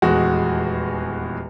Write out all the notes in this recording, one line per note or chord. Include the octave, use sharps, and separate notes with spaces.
D#1 E2 G#3 F#4